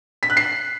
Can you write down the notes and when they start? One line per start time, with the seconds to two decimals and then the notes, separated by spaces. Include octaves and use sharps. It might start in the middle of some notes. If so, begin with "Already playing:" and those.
0.23 B6
0.30 F#6
0.37 C7